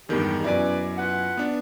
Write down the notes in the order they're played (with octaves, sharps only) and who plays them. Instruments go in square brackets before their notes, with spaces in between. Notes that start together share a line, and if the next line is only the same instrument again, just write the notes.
[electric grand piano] E2 D#3 [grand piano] G2 G3 G#3 [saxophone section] G4
[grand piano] F#2 B2 [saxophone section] C#4 B4 D5 [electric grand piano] E4 G#5
[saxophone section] F4 B4 F#5
[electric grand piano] B3 D4